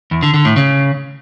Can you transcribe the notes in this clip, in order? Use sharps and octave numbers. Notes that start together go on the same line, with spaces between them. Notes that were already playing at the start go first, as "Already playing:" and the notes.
E2
D3
D3
A2
C#3